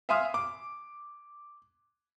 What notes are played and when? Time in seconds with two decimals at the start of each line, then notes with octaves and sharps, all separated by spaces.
0.09 E5 F5 G#5 C6 D#6 F6
0.34 D6